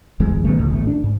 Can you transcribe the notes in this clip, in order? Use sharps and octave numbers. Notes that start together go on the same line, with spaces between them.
D1 G1 E2 G#3
B2 D#3 G3 A3
C#2 A2
G#1 A3
D4
G#2